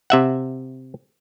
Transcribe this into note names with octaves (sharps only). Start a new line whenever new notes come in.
C3 E5 F#5